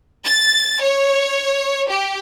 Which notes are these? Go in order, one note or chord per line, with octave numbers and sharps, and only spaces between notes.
A6
C#5
G4